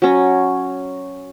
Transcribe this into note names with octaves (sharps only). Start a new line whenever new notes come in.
F#3 C#4